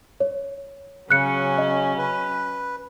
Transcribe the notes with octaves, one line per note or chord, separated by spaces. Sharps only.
C#5
C#3 F#3 C#4 F#6 C#7
D#5
B4